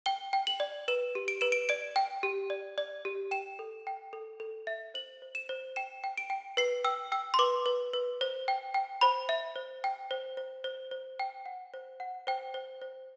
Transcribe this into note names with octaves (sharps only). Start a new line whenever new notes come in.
G5 G7
G5
F#7
D5
B4 E7
G4
D7
B4 E7
D7
D5 D7
G5
G4
D5
D5
G4
G5 E7
A4
G5
A4
A4
E5
C5 F#7
C5
E7
C5
G5 E7
G5
D7
G5
B4 C7
G5 E6
G5 E6
C6
B4 D6
B4
B4
C5
G5
G5
C5 B5
E5
C5
G5
C5
C5
C5
C5
G5
F#5
C5
F#5
C5 G5
C5
C5